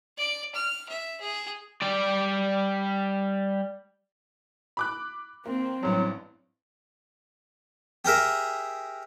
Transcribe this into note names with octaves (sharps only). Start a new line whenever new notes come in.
D5
F6
E5
G#4
G3 D5
B5 D6 F#6
A#3 C4
A1 G2 F#3
G4 G#4 A#4 E5